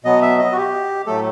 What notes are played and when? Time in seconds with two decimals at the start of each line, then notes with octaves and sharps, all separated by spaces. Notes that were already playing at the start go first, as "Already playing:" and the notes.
0.05 B2 F#3 B3 D#5
0.22 E5
0.39 D#5
0.52 F#4
0.56 G4
1.06 A2 F#3 A3 A4